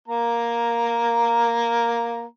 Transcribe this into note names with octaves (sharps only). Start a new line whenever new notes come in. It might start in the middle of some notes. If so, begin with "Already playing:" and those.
A#3 A#5